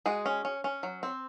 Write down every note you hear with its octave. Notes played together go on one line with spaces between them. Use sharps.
G#3 F#4 G#4
C#4
C#4
C#4
F#3
C4